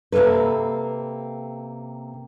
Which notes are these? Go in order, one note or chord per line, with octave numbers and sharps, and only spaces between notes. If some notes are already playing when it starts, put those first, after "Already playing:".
C3 A#3 C#4 A4 B4